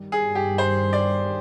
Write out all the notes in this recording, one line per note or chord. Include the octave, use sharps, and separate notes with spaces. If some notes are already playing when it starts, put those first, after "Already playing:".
Already playing: G2 D#3 G3
G#4
G4
C5
D5